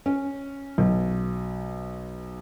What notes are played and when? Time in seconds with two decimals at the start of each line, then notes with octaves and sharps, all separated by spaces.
0.06 C#4
0.78 B1